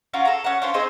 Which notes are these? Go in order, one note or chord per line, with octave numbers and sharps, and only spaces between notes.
C#4 F4 F#4 A#4
A4 A#5
C#4 F#5
C#4 D4 F4 C5
C4 D#4 G#4 C5